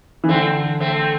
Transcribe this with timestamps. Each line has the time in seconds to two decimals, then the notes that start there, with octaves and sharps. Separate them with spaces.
0.24 E3
0.29 D3 A3 C4
0.80 A3 C4